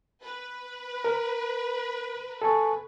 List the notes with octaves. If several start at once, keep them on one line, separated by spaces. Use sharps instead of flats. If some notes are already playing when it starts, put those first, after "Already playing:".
B4
A#4
A4 G#5 C#6